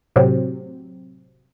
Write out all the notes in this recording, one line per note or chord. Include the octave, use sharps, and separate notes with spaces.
A2 C3 F#3 C4